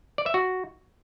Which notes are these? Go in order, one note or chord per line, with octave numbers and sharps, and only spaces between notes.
D5
E5
F#4